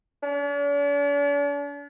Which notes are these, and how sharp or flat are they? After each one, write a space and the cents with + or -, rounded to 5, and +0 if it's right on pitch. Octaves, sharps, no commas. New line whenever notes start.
D4 -45